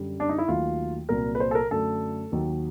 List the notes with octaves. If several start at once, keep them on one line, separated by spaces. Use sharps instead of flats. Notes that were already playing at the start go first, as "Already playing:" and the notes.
Already playing: F#2 D3 G3
D4
D#4
E4
D#2 D#3 F#3 A3 F4
C2 A#2 F#3 A#4
B4
C5
A4
A#4
F#2 D3 F#3 A3 A4
D#2 D#3 F#3